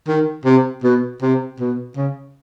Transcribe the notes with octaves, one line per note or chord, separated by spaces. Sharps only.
D#3
C3
B2
C3
B2
C#3